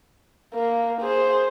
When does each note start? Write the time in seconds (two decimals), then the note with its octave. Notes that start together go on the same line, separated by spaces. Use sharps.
0.54 A#3
1.01 G#4 C5